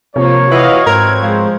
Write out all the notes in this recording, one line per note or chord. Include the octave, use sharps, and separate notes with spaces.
C3 F3 A#3 F4 C#5
E3 F#4 D#5 F5
G#2 C4 A#4 B4 C#5 G#6
F3 G#3